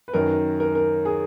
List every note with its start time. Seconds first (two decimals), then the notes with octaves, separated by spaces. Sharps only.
0.08 B4
0.14 F#2 D#3 A#4
0.60 A#4
0.75 A#4
1.05 G#4